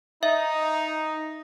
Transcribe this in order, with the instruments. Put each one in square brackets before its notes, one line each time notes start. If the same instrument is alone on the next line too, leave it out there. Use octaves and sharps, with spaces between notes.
[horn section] D#4 [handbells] E5